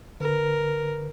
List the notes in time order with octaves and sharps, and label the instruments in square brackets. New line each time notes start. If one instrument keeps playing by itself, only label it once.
[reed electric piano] D3 B4 [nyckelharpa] A#4